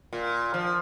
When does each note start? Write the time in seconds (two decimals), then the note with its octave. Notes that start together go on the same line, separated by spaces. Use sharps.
0.13 A#2
0.54 F3